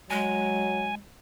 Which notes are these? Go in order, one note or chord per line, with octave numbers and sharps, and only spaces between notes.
F#3 G#3 G#5